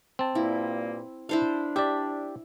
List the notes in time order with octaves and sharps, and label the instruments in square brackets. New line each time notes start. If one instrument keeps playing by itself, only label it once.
[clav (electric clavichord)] C4 A5
[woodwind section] G2 A#2 A#3 [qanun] E4
[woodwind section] D4 [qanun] E4 C5 F5
[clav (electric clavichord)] G4 D5 [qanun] E5